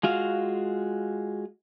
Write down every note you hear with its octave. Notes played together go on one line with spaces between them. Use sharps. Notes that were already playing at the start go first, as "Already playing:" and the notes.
G#3 F4 F#4 F5